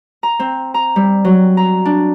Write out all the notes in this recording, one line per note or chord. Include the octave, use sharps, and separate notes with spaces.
A#5
C4
A#5
G3
F#3
A#5
D4